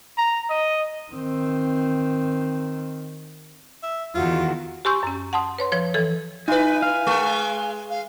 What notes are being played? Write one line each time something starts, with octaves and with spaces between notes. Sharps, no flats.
A#5
D#5
D#3 C4
E5
E2 D#3 F4 F#4
G4 G#5 C6 C#6 E6 G6
F#2 C#4
F#5 A5 C6 D#6
B4 C#5 C6
F3 B4 C#5
E3 A4
D#4 E4 B4 G#5
F5
G#3
F5